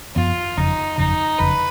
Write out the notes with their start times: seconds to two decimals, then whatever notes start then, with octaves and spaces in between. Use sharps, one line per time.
0.16 F#2 F3 B3 F4
0.57 F#1 F2 C#3 D#4
0.98 F#1 F2 C#3 D#4
1.39 F#1 F2 C#3 B4